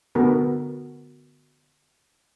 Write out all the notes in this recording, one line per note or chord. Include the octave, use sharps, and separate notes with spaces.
D3 B3 F#4 A4 A#4